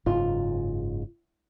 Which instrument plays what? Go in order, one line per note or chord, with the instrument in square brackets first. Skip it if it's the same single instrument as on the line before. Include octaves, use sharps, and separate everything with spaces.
[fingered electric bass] F#1 G#2 C#3 [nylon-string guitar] F4